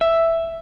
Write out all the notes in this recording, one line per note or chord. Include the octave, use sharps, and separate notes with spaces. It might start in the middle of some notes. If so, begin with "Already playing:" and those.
E5